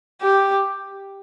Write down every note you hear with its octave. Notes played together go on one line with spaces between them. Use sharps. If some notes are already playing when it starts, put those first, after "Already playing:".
G4